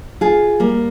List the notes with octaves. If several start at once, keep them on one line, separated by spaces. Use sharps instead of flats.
F4 G#4
G3 A#3